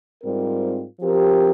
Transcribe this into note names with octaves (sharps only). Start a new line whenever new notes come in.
G#2 G3 C4 F4 A#4
F3 C4 G4 A#4